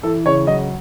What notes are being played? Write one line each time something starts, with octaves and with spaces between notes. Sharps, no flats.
E3 A4
C#3 C#5
F#3 D#5